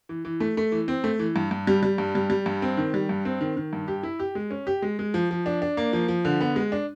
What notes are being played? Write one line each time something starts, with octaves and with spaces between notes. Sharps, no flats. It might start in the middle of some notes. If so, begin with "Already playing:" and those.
E3
E3
A3
A3
E3
C4
A3
E3
G2
G2
G3
G3
G2
G3
G3
G2
C4
D#3
G3
G2
C4
D#3
D#3
G2
G4
E4
G4
G#3
C#4
G4
G#3
G#3
F3
F3
D4
D4
A#3
F3
F3
D3
B3
G#3
D4